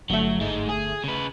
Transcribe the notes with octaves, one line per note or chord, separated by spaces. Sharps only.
G1 F#3 A3
G#2 G#3
G#4
C#3 B4